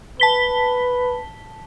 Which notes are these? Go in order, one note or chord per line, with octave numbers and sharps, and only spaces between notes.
B4 A5 B6 G7